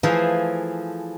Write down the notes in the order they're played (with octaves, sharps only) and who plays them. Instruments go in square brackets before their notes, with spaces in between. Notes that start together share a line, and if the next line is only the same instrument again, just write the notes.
[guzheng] E3 F3 A3 E4 G#4 C5